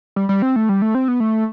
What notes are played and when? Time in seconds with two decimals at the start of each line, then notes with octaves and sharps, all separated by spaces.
0.16 G3
0.29 G3
0.42 C4
0.56 A3
0.69 G3
0.82 A3
0.95 C4
1.08 B3
1.20 A3